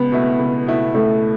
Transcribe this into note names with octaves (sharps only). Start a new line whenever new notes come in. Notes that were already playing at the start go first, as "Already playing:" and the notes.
Already playing: C#2 B3
B2 A3 E4
C#2
B2 A3 E4
C#2 A3